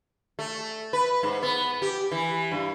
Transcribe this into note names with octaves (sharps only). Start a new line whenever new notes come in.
A3
B4
G#2
B3
G4
E3
G2